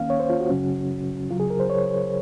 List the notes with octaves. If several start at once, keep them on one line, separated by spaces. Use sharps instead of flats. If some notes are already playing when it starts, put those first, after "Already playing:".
Already playing: D#2 D#3 A#3 C#4 F5
C#5
C5
F4
F#4
F#2 C#3 F#3 C#4
C#2 C#3 F#3 F4
G#4
A#4
C5
C#5